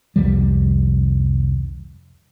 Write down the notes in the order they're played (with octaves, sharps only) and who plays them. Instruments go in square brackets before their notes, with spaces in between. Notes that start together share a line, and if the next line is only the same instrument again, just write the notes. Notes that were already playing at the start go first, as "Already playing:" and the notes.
[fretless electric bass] C2 F2 D#3 G3